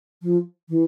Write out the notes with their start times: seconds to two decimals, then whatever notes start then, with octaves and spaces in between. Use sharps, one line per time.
0.22 F3
0.69 E3